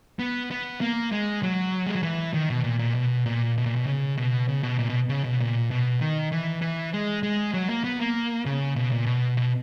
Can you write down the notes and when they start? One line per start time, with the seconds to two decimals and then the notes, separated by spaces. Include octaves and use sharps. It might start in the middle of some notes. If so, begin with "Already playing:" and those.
0.19 B3
0.51 B3
0.81 A#3
1.12 G#3
1.43 F#3
1.86 G#3
1.95 F#3
2.03 E3
2.34 D#3
2.50 B2
2.64 A#2
2.79 A#2
2.95 B2
3.26 A#2
3.58 B2
3.66 A#2
3.76 B2
3.86 C#3
4.17 B2
4.48 C#3
4.63 B2
4.79 A#2
4.89 B2
5.09 C#3
5.24 B2
5.40 A#2
5.71 B2
6.00 D#3
6.32 E3
6.62 E3
6.93 G#3
7.23 G#3
7.54 F#3
7.69 A#3
7.84 B3
8.00 A#3
8.46 C#3
8.76 B2
8.92 A#2
9.06 B2
9.37 B2